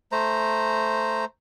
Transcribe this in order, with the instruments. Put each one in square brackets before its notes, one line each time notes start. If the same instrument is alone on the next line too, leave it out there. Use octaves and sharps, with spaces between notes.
[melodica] A3 C5 A#5